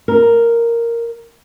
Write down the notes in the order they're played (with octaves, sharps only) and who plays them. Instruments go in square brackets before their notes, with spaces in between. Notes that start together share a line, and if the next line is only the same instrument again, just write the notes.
[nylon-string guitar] A#4